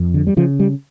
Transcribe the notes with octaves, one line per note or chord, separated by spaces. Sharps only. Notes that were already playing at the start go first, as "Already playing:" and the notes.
Already playing: F2
D3
G3
C#3 F3
G3